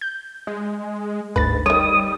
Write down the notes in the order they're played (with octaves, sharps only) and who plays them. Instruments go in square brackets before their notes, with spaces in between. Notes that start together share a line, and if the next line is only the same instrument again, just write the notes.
[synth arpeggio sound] G6
[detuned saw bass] G#3
[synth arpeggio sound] G1 D2 A6 [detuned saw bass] G#2 [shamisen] B4
[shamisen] D#3 C#5 [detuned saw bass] G3 [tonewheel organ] D#6